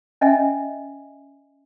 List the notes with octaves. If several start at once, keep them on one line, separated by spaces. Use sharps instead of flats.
C#4 D#5 E5 G#5